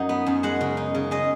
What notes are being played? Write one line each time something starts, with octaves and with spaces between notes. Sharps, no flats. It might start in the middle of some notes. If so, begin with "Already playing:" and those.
Already playing: F#2 F#3 D#4
B3
F#2
G#3 F#5
C#3
D#4
C#3
G#3 D#5